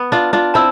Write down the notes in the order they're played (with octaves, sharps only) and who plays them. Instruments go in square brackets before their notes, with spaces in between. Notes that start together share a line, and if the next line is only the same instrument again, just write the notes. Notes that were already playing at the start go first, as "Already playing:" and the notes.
Already playing: [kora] B3
D4 F4
D4 F4
[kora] C4 E4 [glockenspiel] A5 E6